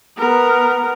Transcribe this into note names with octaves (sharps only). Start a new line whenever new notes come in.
B3 A#4